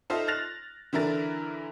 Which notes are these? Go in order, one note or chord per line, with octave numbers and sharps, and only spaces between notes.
D#4 F4 A4 C5 D#5 E5
F6 F#6 A6 A#6 F7
D3 E3 E4 A#4 A6